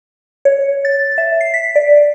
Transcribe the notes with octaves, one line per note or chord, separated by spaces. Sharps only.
C#5
A6
E5
C7
B6
D5